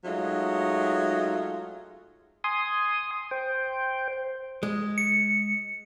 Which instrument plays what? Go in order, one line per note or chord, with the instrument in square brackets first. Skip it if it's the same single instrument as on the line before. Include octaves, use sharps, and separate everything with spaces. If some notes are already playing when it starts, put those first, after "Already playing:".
[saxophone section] F#3 G#3 A3 D#4 F4
[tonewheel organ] G#5 C6 D#6
C5 G5
[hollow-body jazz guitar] G#3
[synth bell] C#7